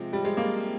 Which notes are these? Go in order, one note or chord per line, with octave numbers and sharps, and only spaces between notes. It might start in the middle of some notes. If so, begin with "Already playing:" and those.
Already playing: C3 F3 G#3
G3
G#3
A#3